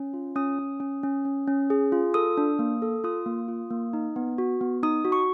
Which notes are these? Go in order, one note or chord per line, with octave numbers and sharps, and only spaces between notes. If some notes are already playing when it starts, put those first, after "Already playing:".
Already playing: C#4
F4
C#4 D#6
C#4
C#4
C#4
C#4
C#4
G#4
F4
A4 D#6
D4
A#3
A4
F4 D#6
A#3
F4
A#3
D#4
B3
F#4
B3
D#4 D#6
F#4
C#6